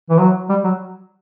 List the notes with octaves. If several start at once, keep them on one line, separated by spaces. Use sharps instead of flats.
E3
F#3
G3
F#3